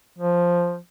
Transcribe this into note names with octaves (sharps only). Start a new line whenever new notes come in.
F3